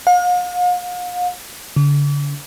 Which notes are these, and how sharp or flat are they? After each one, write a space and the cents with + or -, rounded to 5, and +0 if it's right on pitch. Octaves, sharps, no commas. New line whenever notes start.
F5 +45
D3 -40